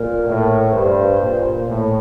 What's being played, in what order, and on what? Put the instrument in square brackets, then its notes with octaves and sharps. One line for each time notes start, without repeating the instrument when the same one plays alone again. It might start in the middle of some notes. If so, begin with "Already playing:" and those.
Already playing: [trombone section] A#2 [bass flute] A#4
[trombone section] A2
[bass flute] A#4
[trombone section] G2 [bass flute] C5
[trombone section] A#2
A2